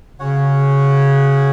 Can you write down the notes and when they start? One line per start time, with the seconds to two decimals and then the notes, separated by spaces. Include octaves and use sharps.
0.19 C#3 C#4 F#4 C#5 F#5